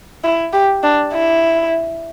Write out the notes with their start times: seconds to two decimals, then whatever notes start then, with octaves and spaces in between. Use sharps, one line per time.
0.24 E4
0.53 G4
0.83 D4
1.13 E4